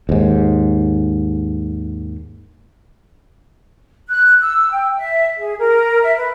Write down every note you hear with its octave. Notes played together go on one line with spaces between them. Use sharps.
D#2 G#2
F#6
E6
G5
E5
G#4
A#4
E5
B4